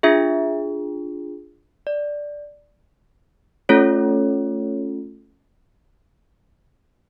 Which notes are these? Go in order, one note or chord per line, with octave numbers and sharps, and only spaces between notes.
D4 F4 G#4 E5
D5
A3 C#4 F4 A4 C#5